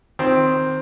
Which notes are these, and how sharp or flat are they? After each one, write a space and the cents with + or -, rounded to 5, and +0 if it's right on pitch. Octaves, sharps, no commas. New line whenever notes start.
D#3 +0 C4 +0